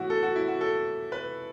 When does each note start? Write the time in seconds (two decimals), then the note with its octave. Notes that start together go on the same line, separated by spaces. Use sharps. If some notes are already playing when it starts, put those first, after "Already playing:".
Already playing: A2 E3 B3 E4 F#4
0.10 A4
0.23 F#4
0.36 E4
0.48 F#4
0.61 A4
1.12 B4